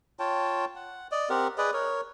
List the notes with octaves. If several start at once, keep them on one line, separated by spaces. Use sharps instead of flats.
F4 C#5 G5 A5
F#5
D5 D#5
C4 G4 A#4 F#5
G#4 B4 D5 D#5
A#4 C#5